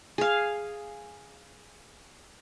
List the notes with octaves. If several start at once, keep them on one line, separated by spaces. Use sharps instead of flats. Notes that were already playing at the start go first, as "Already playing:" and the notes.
G#4 F5